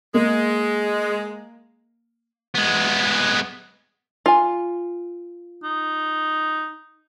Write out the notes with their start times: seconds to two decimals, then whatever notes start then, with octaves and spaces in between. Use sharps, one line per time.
0.14 G#3 A#3
2.55 G#3 B3
4.26 F4 G#5
5.64 D#4